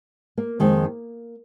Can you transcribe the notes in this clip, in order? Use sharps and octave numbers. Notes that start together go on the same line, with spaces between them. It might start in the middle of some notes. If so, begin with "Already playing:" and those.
A#3
F2 D#3 G#3